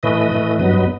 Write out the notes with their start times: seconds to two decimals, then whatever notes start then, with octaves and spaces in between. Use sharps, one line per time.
0.03 A2 E3 A3 B4 D#5
0.32 A2 E3 A3
0.59 G2 F#3 B3 B4 D#5